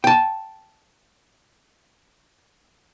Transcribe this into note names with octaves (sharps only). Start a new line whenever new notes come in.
G5 A5